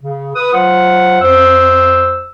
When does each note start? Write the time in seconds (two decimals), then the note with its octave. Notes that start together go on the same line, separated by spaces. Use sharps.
0.01 C#3
0.35 B4 D#6
0.53 F#3 F4 C5 F#5
1.21 F2 C5 E6